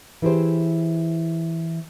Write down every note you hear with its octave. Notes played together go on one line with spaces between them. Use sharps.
E3 E4 G4 G#4 C5